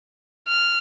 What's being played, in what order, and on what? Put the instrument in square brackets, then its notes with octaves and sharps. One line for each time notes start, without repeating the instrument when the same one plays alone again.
[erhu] F6